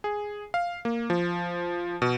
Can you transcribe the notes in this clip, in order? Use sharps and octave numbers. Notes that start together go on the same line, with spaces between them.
G#4
F5
A#3
F3
B2